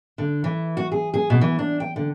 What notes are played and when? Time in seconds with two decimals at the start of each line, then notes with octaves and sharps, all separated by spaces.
0.18 D3
0.44 E3
0.77 F#4
0.92 G#4
1.14 G#4
1.30 B2
1.41 E3
1.59 D4
1.80 G5
1.96 D3